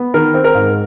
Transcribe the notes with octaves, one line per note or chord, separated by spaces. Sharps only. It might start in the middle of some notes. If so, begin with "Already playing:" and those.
Already playing: B3
D#3 A#4
C4
A#4
G#2